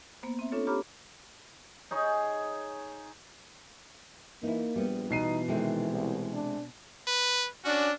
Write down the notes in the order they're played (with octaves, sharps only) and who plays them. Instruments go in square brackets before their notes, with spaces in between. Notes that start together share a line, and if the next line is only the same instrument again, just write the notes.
[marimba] A#3 B3 C5
C4 E5
C#4 D4 F4 A4 C#5
G4 C#5 A#5 B5 D6 F6
[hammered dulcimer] D#4 G#4 C#5 G#5
[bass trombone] E3 [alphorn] A#3 [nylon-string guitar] D#4 E4
[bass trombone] A#1 [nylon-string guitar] G3 B3
[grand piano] B2 C7 D#7 [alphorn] E3 [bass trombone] D#4
[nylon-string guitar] C3 G#3 A3 [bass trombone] D#3
[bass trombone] C2
D4
[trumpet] B4
[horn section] C#4 D4 [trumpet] F#4